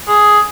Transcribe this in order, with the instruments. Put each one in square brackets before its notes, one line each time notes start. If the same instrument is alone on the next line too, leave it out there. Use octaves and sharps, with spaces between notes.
[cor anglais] G#4